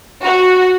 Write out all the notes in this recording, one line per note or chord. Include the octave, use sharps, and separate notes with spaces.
F#4